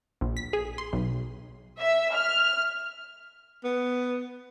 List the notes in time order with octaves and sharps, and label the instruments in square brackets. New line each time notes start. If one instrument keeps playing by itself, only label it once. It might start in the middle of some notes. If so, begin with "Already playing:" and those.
[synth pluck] A#1
B6
G#4
C6
B1
[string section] E5
F6
[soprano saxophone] B3